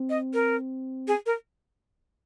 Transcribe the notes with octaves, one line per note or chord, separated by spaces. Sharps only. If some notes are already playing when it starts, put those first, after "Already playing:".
Already playing: C4
D#5
A#4
G#4
A#4